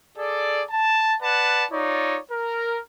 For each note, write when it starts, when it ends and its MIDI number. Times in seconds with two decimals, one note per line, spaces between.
0.17 0.62 68
0.17 0.62 69
0.17 0.62 74
0.70 1.15 81
1.22 1.65 71
1.22 1.65 74
1.22 1.65 78
1.22 1.65 81
1.71 2.18 63
1.71 2.18 65
1.71 2.18 73
1.71 2.18 74
2.31 2.78 70